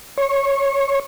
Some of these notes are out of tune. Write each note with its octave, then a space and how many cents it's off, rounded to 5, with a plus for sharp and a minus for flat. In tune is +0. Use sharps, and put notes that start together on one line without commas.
C#5 +0 C#6 -35